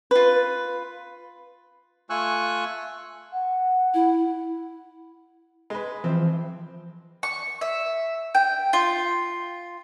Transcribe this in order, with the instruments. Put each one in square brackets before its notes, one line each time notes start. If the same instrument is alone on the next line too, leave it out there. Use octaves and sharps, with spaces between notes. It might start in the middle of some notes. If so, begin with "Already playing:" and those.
[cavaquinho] F4 B4
[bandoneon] A3 F4 G#5 C#6 E6 F#6
[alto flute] F#5
[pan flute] E4
[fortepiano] G#3 B4
[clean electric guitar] E3 F3 [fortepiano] C4
[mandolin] C#6
E5
G5
F4